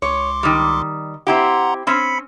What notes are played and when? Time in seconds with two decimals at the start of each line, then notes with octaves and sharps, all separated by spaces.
0.02 C#2 C#5 C6 D6
0.43 D#3 G3
1.27 C4 E4 G4 F#5 A#5 C6
1.87 C4 C#4 B5 B6 C#7